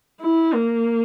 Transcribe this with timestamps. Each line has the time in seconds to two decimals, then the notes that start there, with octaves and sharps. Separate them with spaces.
0.21 E4
0.54 A#3